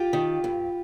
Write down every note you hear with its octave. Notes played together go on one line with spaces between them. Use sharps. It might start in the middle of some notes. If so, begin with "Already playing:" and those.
Already playing: F4 G4
D#3
G2